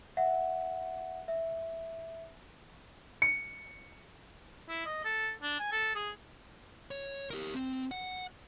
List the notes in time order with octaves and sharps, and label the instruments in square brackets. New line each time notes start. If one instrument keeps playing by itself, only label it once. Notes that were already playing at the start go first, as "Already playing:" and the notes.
[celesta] E5 F#5
E5
[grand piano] C#7
[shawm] E4
D#5
A4
D4
G#5
A4
G#4
[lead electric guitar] C#5
G4 A#4
C4
F#5